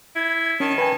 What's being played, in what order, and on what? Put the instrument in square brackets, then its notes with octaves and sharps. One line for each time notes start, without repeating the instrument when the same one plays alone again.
[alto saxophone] E4 [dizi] G#6
[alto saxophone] D#3 [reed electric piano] C#4 [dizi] A5
[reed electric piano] B4 G5 G#5